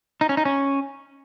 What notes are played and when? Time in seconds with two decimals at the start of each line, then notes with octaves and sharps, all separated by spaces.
0.21 D#4
0.29 C#4
0.37 D#4
0.45 C#4